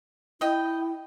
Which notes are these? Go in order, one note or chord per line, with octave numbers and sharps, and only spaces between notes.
E4 D#5 G5